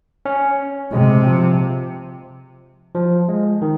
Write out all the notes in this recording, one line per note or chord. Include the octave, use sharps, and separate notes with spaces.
C#4
C3 G#3
F3
F3
G#3
D#3